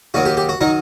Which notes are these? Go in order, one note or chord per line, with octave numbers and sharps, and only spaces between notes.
D#2 D#3 F#3 F#4
G4
G4
F#4
D#3 F#3 D#4